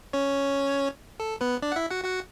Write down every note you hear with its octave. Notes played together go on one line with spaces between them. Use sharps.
C#4 C#5
A4
B3 B4
D4 D5
F#5
E4 E5
F#4 F#5
F#4 F#5